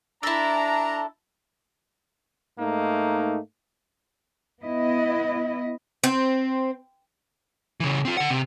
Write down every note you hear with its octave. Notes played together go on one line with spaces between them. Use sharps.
D4 E4 A4 A#5
G#2 A3 A#3 D#4
B3 E4 D#5
C4
C#3 E3
C4 F4
D3 F#5
C3